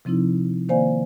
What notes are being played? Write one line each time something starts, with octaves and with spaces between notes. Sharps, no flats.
C3 F3 C4 D#4 E4
D#3 A#3 C5 D5 F5 G#5